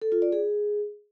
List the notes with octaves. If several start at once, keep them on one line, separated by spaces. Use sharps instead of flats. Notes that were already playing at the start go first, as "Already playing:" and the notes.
A4
F4
D5
G#4